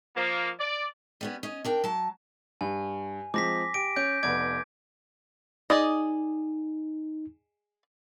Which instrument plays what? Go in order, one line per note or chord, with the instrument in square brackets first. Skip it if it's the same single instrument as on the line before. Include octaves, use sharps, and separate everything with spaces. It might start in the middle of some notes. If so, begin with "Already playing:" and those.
[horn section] F3 A#3
D5
[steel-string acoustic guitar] G3 B3 C#4
C#4 D#5
D4 A#4 G5
F#3 A5
[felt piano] G2 [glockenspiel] G#5
[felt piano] F3 G#3 C4 [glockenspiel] D6 A#6 B6
[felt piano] G4 [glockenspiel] D7
[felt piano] C#4 [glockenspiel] G6 D7
[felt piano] F1 B3 D5 [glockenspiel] D6 G#6 D7
[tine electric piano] D#4 [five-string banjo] G#4 D5 D#5